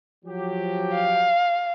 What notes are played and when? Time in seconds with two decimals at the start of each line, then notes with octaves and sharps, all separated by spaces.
0.25 F3 F#3 G4
0.94 F5